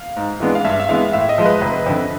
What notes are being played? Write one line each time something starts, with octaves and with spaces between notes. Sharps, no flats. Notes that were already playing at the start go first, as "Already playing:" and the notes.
Already playing: F5
G#2
E3 G#3 B3 D4
F5
G2 E5
E5
E3 G#3 B3 F5
A2 E5
D#5
F3 G#3
B4
F1
F2 D3